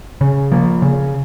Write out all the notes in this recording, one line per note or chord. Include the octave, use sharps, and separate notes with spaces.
C#3
F3 A#3
C#3